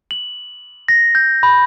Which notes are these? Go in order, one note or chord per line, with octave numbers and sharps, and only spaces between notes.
F#7
A#6
G6
B5